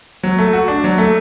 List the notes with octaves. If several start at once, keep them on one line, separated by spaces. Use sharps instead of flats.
F#3
A3
F#4
D4
F#3
A3